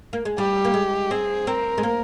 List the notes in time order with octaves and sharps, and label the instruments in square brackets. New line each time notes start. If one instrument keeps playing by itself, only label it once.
[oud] A#3
G#3
[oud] G3 [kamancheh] G4
[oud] A#3
G#3
[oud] C4 [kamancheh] G#4
[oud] C4 [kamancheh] A#4
[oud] G#3
A#3